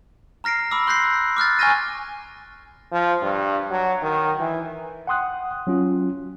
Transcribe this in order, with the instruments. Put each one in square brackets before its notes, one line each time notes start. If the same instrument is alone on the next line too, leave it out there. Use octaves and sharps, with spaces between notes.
[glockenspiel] A#5 F6 A#6 C7 D7
B5 D6 E6
C6 F#6 G6 A#6 C7
D6 F6 F#6 A6
G#5 C#6 F6 G#6 A#6 D#7
[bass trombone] F3
G2
F#3
D#3
E3
[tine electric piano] F#5 G5 C6 D#6 F#6
F#3 C#4 F4